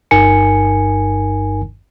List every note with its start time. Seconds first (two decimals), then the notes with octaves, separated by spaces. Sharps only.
0.11 G1 G2 D#4 A#4 G#5 C#7